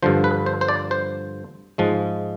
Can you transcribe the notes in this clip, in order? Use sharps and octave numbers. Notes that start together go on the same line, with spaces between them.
G2 D3 F3 C5
B4
C5
C5
D5
C5
G#2 F3 G#3